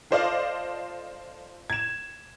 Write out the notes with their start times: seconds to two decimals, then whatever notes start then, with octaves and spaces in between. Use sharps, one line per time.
0.11 F4 A4 C5 D5 D#5 F5
1.70 G#6 E7